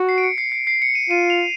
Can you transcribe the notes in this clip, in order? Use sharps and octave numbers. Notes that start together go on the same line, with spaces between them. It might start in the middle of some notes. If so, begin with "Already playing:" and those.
Already playing: F#4
C7
D7
C#7
C7
C7
C7
C#7
D#7
F4 D#7
F7